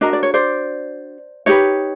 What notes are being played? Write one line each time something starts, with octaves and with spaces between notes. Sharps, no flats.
D4 F#4 A#4 D#5
D5
C#5
C5 D5
D#4 G4 B4 C#5 D#5